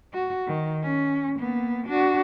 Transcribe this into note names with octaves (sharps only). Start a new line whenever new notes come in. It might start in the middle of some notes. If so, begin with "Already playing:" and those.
F#4
D#3
C#4
A#3 B3
D4 F#4